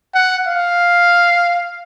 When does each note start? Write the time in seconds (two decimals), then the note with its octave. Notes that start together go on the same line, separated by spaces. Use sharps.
0.15 F#5
0.47 F5